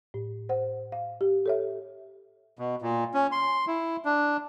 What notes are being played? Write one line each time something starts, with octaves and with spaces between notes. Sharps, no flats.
A2
C5 F#5
F5
G4
A4 C#5 E5
B2
A#2
C#4
C6
E4
D4